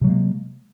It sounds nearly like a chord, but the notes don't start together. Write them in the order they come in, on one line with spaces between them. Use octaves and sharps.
C3 F#3 G#3 A#3